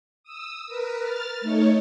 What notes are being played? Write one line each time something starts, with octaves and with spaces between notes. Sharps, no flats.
D#6 E6
A#4 B4
F6 A6
A3 D#4 C#5